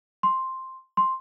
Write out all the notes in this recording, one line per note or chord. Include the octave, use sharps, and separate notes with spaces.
C6
C6